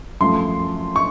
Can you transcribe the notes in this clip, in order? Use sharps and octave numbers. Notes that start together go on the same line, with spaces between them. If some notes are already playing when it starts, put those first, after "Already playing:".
F#2 F3 A3 C6
C#6